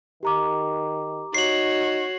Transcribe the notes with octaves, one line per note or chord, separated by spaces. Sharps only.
D#3 G4 A#5 D6
D#4 F#4 C#5 C7 F#7